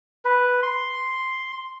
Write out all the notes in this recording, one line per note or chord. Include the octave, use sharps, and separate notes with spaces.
B4
C6